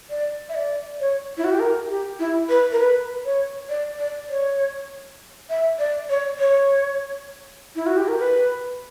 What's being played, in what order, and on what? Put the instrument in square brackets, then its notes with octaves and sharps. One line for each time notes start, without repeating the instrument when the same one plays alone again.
[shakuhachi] D5
E5
D5
C#5
E4
F#4
G4
A#4
G4
E4
B4
A#4
B4
C#5
D5
D5
C#5
E5
D5
C#5
C#5
E4
F#4
G4
A#4
B4